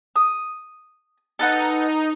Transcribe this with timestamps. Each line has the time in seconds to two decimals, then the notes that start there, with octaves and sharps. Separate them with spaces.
0.16 D#6
1.39 D#4 A4 B4 F#5